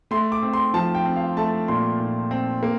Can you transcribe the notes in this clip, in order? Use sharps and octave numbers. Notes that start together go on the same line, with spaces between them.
A3 C6
D6
C4
C6
F3 A5
G5
C4
F5
A3 A5
A#2 C6
A#2
C4
A#3